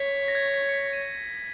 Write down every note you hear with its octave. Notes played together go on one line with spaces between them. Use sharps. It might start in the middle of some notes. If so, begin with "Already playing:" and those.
Already playing: C#5 B6
A#6
G#6
B6
C#7
B6
D#7